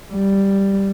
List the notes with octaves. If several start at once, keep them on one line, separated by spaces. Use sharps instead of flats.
G3